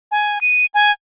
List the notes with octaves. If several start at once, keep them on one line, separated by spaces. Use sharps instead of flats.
G#5
D#7
G#5